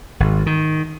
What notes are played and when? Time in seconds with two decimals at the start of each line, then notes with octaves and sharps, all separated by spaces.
0.20 G#1
0.46 D#3